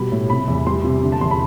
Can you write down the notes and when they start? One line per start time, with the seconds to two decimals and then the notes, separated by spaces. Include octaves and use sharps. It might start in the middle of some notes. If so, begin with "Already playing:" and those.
Already playing: B2 G3 B5
0.12 A2
0.30 C3 B5
0.48 E2
0.67 G3 C6
0.84 C3
1.03 D3
1.12 A5
1.21 E2 C6
1.31 B5